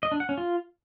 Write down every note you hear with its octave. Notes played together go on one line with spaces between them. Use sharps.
D#5
D4
F#5
C#4
F4